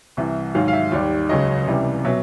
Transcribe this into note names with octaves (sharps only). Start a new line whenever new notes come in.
C2 C3 E3
G#2 D#3 F#3 F5
F5
E5
D#2 D#3 G3
C#2 C#3 F#3 D#5
C#2 C3 E3 G3
B2 F#3 E5